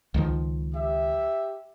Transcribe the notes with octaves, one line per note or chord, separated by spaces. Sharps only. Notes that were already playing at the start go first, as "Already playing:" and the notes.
C#2 D#3 F3
G4 E5